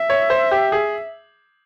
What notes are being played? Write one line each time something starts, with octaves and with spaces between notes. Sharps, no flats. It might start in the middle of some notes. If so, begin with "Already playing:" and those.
Already playing: E5
C#5
C5
G4
G#4